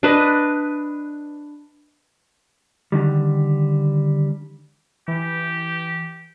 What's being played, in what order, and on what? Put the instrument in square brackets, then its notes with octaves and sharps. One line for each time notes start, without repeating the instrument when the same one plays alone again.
[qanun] D4 B4 D#5
[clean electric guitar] D3 D#3 G3
[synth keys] E3 [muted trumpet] G4